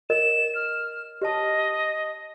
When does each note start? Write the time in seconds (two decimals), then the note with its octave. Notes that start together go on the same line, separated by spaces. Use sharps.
0.10 A#4 C#5 D#5 E7
0.55 F6
1.22 G4 C#5 D#5 A5